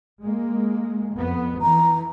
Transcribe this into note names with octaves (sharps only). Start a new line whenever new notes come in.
G#3 A#3
F2 B3
E3 A#5